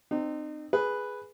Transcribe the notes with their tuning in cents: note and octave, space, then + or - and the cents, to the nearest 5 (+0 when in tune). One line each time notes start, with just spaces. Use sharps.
C4 -10 D#4 -35
G#4 +0 B4 +0